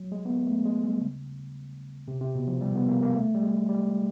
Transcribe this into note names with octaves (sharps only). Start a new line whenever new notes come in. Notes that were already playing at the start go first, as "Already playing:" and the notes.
Already playing: F#3
G#3
B3
A#3
A3
G#3
G3
C#3
C3
C3
B2
F3
G3
B3
A#3
A#3
A3
G3
G#3
G3